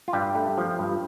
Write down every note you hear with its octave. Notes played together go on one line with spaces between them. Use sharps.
F4
G2 G3 G4
A3
F3
G2